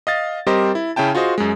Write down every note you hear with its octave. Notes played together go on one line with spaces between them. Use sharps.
D#5 F5 A6
G3 C4 G4 A#4 C5 D#5
E4
C#3 C#4 E4 G5 A5
F4 F#4 G#4 C5 D#5
F#2 G#3